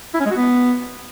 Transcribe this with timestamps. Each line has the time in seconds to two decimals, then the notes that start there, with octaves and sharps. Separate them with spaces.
0.14 E4
0.20 C#4
0.25 G#3
0.31 F#4
0.36 B3